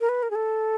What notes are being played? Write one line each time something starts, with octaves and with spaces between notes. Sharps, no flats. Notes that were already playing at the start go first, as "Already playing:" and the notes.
A#4
B4
A#4
G#4
A4